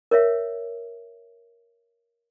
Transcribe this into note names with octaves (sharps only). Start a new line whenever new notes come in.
A#4 C#5 E5 F5